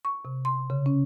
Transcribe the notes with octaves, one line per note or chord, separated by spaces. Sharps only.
C#6
C3
C6
C#3
C#4